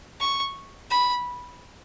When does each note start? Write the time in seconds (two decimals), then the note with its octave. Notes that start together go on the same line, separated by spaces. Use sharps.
0.20 C#6
0.91 B5